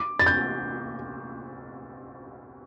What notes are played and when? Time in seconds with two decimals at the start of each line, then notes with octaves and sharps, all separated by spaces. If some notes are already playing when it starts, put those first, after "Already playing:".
Already playing: D6
0.19 A6
0.26 G6